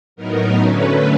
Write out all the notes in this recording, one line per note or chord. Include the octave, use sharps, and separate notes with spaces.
A2 F#3 B3 D#4 A#4
D3 F#3 A3 C#4 B4